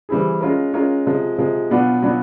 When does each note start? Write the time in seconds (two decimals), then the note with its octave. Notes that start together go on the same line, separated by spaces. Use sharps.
0.09 E3 G3 C4 E4 G#4
0.41 G#3 C#4 F4 A#4
0.74 G#3 C#4 F4 A#4
1.06 C3 F3 G#3
1.38 C3 F3 G#3
1.70 B2 F#3 B3 D4 F4
2.02 B2 F#3 B3 D4 F4